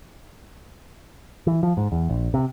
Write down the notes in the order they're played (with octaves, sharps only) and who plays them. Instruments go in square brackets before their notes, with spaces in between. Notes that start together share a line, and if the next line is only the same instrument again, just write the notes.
[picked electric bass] E3
F3
G#2
E2
A#1
C3